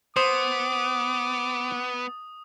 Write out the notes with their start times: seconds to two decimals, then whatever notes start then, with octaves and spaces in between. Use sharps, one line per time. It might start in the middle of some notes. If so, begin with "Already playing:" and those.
0.16 B3 C5 D6 D#6